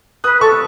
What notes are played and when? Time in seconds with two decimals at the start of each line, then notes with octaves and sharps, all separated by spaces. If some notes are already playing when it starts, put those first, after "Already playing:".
0.24 B4 D#6 F#6
0.41 A4 C#6 E6